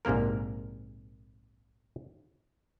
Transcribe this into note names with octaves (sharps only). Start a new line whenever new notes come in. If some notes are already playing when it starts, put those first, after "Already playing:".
A#1 G#2 C3 A#3 A#4